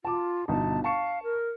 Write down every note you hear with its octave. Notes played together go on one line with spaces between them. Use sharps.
F4 A5 D6
G1 B2 D#4 A5
F5 A5 C#6 C#7
A#4